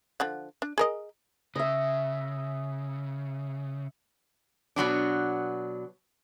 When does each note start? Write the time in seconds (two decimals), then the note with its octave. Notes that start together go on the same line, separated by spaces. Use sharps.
0.20 D3 F3 F#5
0.62 D4
0.78 G#4 A#4 D#5
1.56 C#3 D#5 E5
4.76 B2 F#3 B3 D4